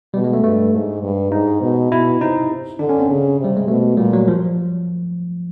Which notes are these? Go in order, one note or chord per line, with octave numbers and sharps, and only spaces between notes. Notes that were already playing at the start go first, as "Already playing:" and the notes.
B2 G3
G#3
A3
G2 A3
G#2
G2
G#2 D#4
B2
B2 E4
C3 D#4
D3 D4
C#4
C4
C#3
C3 G3
G#3
B2 A3
A#2 G3
F#3
F3